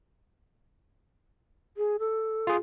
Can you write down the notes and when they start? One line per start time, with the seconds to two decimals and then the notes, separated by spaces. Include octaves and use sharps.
1.77 G#4
1.99 A4
2.47 F4 G#4